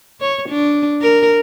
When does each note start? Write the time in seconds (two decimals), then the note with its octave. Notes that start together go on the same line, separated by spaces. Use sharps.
0.21 C#5
0.49 D4
1.02 A#4